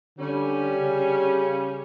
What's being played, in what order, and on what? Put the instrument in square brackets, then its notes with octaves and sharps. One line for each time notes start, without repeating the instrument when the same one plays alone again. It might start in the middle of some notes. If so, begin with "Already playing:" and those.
[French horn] D3 [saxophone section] G3 C#4
[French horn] C#3